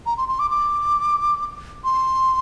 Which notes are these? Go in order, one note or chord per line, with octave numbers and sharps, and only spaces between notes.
A#5
C6
C6
D6
D6
C6